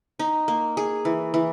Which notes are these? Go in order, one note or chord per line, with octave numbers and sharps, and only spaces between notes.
D#4
A#3
G#4
E3
E3